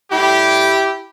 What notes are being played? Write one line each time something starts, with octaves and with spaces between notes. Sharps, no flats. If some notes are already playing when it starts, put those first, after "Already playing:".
A2 G3 E4 G4